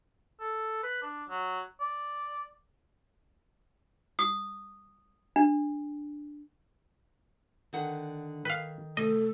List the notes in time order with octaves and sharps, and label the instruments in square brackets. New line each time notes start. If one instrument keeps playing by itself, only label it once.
[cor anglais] A4
B4
D4
F#3
D5
[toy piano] D#6
D4
[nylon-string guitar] D3 D#3 F#5
[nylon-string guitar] D#3 [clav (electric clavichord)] B4 F5
[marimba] C3 A3 [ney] A4 [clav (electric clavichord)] D#5